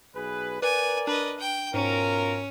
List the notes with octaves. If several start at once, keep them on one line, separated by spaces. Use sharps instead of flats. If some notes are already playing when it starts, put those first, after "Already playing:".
B1 G#4 B4
A#4 B4 D5 G#5
D4 B4 D#5
G5
G#2 B2 C#4 F4 A#4